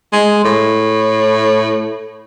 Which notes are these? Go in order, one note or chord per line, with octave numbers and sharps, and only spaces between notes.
G#3
A2